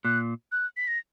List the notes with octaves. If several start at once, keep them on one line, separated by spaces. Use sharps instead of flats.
A#2 F#6
F#6
B6
A#6